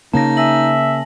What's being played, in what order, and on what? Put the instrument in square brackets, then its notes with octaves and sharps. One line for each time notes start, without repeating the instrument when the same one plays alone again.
[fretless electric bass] C#3 A#3 [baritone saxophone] D#4 [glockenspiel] A5 A#6
[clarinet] E5 [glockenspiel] G#5 A#6 F#7